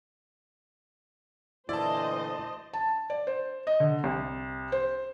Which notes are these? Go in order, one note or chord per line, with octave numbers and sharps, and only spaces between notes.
D2 A#2 E3 E4 C5 D5 D#5 A5
A5
D5
C5
D#5
D3
C2
C5